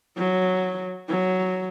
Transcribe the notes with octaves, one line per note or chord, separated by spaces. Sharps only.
F#3
F#3